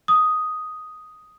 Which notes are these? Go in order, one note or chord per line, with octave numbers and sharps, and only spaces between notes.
D#6